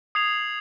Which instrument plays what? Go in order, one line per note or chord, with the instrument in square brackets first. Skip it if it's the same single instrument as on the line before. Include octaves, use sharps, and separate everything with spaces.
[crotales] D#6 G#6 C7 F7